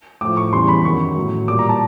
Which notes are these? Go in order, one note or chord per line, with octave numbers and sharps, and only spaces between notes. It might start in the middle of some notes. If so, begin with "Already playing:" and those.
A2 F3 D6
C#6
E2 C#3 E3 G3 C6
B5
F#2 D#3 F#3 C#6
A2 F#3
A#2 G3 D6
A#5
A5